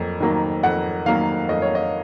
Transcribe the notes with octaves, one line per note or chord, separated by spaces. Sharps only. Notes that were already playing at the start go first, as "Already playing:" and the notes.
Already playing: F2 F#3 A#3
D#3 F#3 A#3
F2 F#5
D#3 F#3 A#3 F5
F2 D#5
C#5
D#5